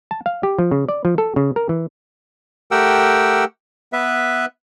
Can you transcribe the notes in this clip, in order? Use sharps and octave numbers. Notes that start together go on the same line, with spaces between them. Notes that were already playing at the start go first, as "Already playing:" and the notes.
A5
F5
G4
F3
C#3
D5
F3
A4
C#3
A#4
E3
A3 G4 A#4 F#5 G5 E6
B3 B4 E5